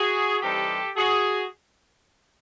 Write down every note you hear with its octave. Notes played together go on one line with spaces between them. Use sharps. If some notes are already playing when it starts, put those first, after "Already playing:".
Already playing: F#4 G#4
C3 E3 G3 C4 D#4 G4 A4
F#4 G#4